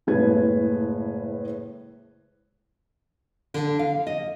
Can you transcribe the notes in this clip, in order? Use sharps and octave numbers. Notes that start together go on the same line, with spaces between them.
F#1 A2 G#3 B4 G#6
D3
F5
D#5